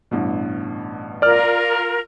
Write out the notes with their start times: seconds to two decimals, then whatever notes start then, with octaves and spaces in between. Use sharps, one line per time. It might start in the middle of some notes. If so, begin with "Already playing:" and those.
0.11 A1 G2 B2
1.22 F4 A#4 D5 F6